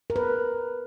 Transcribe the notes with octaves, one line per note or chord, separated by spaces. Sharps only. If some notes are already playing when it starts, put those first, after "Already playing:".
A#4
B4